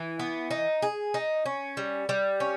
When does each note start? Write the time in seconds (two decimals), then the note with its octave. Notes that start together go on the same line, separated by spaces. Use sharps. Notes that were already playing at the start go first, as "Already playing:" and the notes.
Already playing: E3
0.19 B3
0.51 D#4
0.82 G#4
1.14 D#4
1.46 C#4
1.77 G3
2.09 G3
2.40 C#4